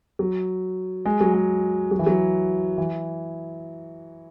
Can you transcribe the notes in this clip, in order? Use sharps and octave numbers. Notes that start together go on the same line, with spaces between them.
F#3
G#3
F#3
G#3
F#3
E3
F#3
E3